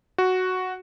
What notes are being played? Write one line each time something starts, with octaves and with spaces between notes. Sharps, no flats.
F#4